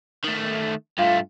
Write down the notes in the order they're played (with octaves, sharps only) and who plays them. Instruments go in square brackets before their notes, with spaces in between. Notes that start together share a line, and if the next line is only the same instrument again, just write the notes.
[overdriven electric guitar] D#3 A3
[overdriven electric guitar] G2 A3 [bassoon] F4